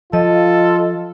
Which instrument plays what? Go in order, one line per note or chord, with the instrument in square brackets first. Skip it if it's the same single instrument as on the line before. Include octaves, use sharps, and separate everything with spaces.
[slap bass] F3 [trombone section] F4 [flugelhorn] A4 [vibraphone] D#5